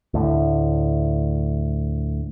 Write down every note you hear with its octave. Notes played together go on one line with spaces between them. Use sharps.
D2 A2